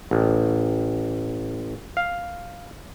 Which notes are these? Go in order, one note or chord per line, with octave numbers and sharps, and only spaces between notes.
A1
F5